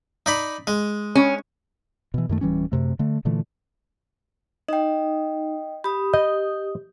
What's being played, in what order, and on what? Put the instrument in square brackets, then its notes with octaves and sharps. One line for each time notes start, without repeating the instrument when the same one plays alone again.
[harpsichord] D#4 D5 B5
G#3
[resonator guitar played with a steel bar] C#4
[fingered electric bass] B2 E3
F#2 D#3 A3
D1 E3 G3 C#4
F#2 C3 A3
D3 A3
A#2 D3 E3 A3
[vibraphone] D#4 [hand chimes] D#5 G5
[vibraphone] G4 D#6 [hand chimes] B5
[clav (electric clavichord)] D#5 [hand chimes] G6